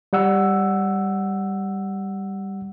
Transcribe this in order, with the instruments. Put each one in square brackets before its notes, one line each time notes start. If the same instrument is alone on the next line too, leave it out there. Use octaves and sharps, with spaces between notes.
[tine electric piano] G3 F#5 E6